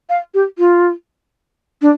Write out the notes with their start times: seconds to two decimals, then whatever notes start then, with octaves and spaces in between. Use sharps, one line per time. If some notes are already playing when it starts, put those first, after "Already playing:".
0.10 F5
0.34 G4
0.59 F4
1.82 D4